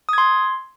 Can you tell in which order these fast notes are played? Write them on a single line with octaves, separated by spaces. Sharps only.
D#6 G#6 C6